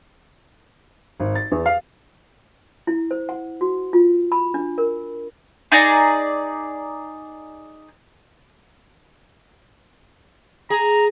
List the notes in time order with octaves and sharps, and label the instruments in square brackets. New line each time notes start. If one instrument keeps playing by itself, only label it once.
[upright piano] G#1
A6
E2
F5
[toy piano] E4
C5
F#5
F#4
F4
B5
D4
A#4
[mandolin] D#4 G#4 D5 A#5
[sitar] G#4 [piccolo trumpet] A#5